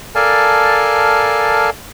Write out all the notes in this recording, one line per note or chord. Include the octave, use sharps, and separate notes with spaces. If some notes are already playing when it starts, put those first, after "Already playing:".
A4 A#4 D5 F5 G#5 A5